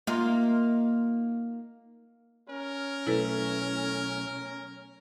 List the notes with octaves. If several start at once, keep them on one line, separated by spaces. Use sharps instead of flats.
A#3 D#4 F4
C#4 A#4
B1 A3 E4 A4 B4